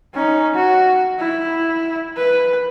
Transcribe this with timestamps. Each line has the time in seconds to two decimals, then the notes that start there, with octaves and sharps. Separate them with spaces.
0.14 C#4 D#4
0.55 F#4
1.19 E4
2.16 B4